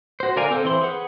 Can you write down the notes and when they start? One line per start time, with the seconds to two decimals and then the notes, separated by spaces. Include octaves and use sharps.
0.20 F#4 C5
0.36 D3 A#4 D5 F5 G#5
0.50 C4 A4 C5
0.65 E3 C5 C6
0.81 G#4 B4 F#5